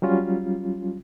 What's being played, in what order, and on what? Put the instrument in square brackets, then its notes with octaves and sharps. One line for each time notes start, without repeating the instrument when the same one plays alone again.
[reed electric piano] F#3 G3 C#4 F4